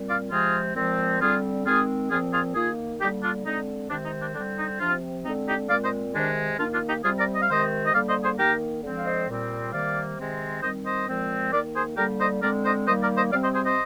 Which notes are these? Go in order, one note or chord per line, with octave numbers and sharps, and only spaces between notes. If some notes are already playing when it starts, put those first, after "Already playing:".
Already playing: A#2 G3 C4
D5 F5
C3 F3 G#3 C4 F4 G#4
A#2 F3 G#3 C4
D3 G3 C4 F4 G#4
D#3 G#3 C4 F4 G#4
A#2 F3 C4 F4 G#4
F4 G#4
D#3 A#3 F4 G#4
D3 G3 A#3 D#4 G4
D4 F4
D3 G#3 C4 D#4
C3 D#3 G#3 C4 D4
D#4
D4
D3 G3 C4 D4
D#4
C3 F3 C4 D4 F4
D3 G#3 C4 D#4
D#4 G4
A#2 G#3 C4 D5 F5
C5 D#5
C3 D#3 G#3 D4
D#3 A#3 D4 F4
D4 F4
D#4 G4
C3 G3 C4 F4 G#4
A#4 D5
D#5
F5
C3 D#3 G#3 C4 C5 D#5
D#5
D3 G3 A#3 D5 F5
C5 D#5
G#4 C5
D#3 A#3 G4 A#4
D3 F3 G#3 C4
F5
C5 D#5
A#2 G3 C4
C3 D#3 G3 A#3 D5 F5
C3 D#3 G#3 C4
D#3 G3 C4 C5 D#5
C5 D#5
A#2 F3 G#3 C4
D#3 A#3 A#4 D5
G#4 C5
D3 G3 A#3 G4 A#4
C5 D#5
D3 G#3 C4 A#4 D5
C5 D#5
D#3 G3 A#3 C5 D#5
A#4 D5
C5 D#5
C3 G3 C4 D5 F5
C5 D#5
G#4 C5
C5 D#5